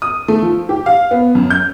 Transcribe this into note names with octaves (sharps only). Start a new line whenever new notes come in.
D#6
A3
F3
G4
F5
B3
F#2
G6